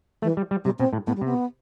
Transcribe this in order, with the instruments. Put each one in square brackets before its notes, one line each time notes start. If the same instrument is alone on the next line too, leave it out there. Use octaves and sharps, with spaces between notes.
[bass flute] E3 [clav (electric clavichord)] A3
[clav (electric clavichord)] G3
G3
[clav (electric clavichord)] C3 [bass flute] G3
[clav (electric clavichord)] B2 [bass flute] C4
[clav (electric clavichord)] A2
[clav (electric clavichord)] A2 [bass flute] B3
[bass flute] G3
[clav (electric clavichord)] C3 [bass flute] B3